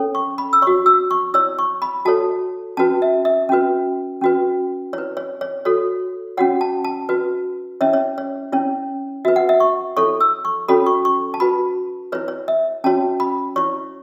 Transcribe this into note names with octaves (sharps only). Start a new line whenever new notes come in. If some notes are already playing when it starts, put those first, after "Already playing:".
Already playing: C#4 A4 C#5
C#6
B5
E6
F#4 C#5 C#6
E6
C#6
E4 C#5 E6
C#6
B5
F#4 A4 C#5 A5
C#4 F#4 B4 A5
E5
E5
C#4 F#4 B4
C#4 F#4 B4
E4 B4 C#5
C#5
C#5
F#4 A4 C#5
C#4 F#4 C#5 F#5
A5
A5
F#4 B4
C#4 E4 C#5 E5
C#5
C#5
C#4 E4 C#5
F#4 B4 E5
F#5
E5
C#6
E4 A4 C#5 C#6
E6
C#6
C#4 F#4 A4 C#5 B5
C#6
C#6
A5
F#4 B4 B5
E4 B4 C#5
C#5
E5
C#4 F#4 C#5 A5
B5
E4 C#5 C#6